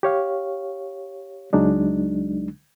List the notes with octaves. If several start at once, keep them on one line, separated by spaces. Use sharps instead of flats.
G4 C#5 F5
C#2 F#3 G#3 D4 D#4